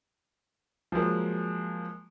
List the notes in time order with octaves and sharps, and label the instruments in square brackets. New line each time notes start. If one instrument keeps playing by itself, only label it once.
[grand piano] F3 F#3 G#3 A#3